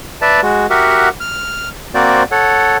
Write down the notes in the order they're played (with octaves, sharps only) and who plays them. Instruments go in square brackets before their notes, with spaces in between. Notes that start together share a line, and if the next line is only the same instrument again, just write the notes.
[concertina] B4 D5 E5 A5
G#3 F#4
F#4 G4 A#4 E5 F#5
F6
A#3 C4 F#4 C5 D5
A4 C#5 F#5